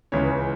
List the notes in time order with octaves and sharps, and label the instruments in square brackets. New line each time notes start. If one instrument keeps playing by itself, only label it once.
[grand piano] C#2 C#3 E3 G#3 C#5